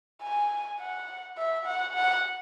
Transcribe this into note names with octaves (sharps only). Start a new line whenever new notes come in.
G#5
F#5
E5
F#5
F#5